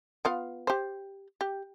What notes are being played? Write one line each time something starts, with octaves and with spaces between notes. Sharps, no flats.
B3 F4 F5
G4 C5
G4